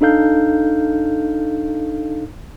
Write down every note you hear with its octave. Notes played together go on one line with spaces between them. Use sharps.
D4 D#4 A4 F5 G6